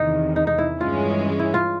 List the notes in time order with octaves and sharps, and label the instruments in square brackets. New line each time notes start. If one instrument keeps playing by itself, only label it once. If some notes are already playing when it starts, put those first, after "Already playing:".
Already playing: [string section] E2 C3 D#3 [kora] D#4
[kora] D#4
D#4
E4
[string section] G2 E3 G#3 C#4 [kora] F4
[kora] E4
F4